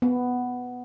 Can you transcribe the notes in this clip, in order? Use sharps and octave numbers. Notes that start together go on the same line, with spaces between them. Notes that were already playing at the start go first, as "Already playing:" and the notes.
B3